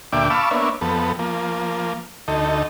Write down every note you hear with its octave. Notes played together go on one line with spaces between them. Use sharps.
D2 A#2 D4 E5 G5 D6
F5 A5 B5 C#6 D6 E6
A#3 B3 D4 C#5 E5
F2 B3 A4
F3 A#3
D2 D#4 A4